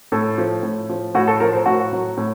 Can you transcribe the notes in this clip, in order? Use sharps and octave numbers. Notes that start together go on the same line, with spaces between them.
A2 A4
F3
A2
F3
A2 F#4
A4
F3 A#4
C5
A2 F#4
F#3
A2